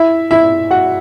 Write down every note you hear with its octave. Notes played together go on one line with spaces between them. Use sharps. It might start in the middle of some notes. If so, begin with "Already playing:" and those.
Already playing: E4 E5
E4 E5
F#4 F#5